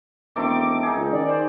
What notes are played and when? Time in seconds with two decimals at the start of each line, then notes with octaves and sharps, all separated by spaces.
0.36 E1 D#3 A3 C4 D6
0.83 D#4 G#4
0.96 C#2
1.13 D#3 D5
1.29 C5